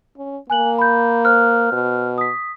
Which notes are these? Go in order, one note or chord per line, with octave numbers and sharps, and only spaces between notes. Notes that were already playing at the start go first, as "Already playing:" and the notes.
C#4
A#3 G#5 F#6 F#7
B5 G6
C5 F6 F#6
B2
D#6 B6